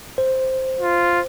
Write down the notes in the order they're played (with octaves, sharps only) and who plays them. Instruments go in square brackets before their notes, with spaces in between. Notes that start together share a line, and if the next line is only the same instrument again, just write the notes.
[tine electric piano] C5
[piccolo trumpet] F4